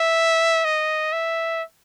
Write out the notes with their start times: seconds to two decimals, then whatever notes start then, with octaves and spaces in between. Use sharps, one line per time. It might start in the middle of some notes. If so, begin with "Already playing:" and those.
Already playing: E5
0.65 D#5
1.12 E5